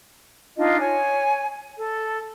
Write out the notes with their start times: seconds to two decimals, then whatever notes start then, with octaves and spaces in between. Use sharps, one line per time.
0.57 D4 D#4 F4 D#5
0.80 C#5 G#5
1.78 A4